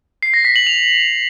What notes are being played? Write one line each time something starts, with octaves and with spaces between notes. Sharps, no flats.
C7
A#6
B6
F#7
F7